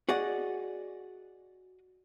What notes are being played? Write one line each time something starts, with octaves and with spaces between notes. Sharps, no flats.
F#4 G#4 D5 D#5 F#5